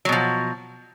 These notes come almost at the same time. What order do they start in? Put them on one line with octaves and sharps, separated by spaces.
F#3 B2 F3